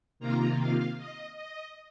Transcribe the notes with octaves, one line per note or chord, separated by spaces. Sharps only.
C3 D#3 A#3 F4 A#5
F5
D#5
D#5